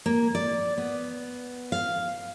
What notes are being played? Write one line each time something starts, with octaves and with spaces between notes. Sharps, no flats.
A#3
D5
B3
F5